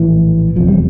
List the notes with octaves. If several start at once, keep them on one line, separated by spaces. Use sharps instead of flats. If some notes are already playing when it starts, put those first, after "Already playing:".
Already playing: A#1 A2 E3
F1 E2 C3 F3
G3